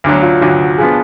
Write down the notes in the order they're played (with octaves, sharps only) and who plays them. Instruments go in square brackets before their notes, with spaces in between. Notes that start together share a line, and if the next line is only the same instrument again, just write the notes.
[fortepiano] D2 D3 F#3 [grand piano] D4
[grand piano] F4
[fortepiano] D2 D3 F#3 [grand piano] F#4
[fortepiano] F3 B3 D4 [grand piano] G#4